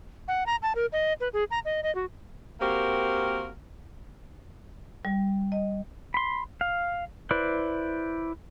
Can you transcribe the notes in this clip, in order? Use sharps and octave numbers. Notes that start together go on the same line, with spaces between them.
F#5
A#5
A5
A#4
D#5
B4
G#4
A#5
D#5
D#5
F#4
A#3 C4 F#4 G4 A#4
G3
D#5
B5 C6
F5
E4 B4 C5 D5